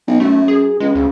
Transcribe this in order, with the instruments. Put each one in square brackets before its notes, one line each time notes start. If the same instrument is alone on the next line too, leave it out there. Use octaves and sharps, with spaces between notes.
[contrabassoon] B1
[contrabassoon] F#2 [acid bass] A3
[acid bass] G#4
[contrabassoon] C#2 [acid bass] G#3
[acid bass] D2 [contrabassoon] C#3